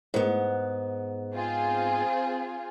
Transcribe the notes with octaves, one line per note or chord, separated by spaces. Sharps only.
G#2 B3
C4 F4 G#4